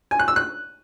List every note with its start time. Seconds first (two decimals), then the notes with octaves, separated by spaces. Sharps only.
0.11 G#5
0.20 F#6
0.28 E6
0.36 F#6